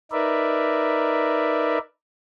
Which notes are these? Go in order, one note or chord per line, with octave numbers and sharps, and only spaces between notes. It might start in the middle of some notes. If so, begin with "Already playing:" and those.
D#4 A#4 B4 D5 E5